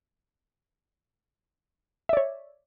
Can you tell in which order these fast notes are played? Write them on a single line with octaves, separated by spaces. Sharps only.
E5 D5 C#5